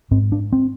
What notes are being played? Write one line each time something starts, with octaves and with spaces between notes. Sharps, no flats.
G#2 C4
D4
C4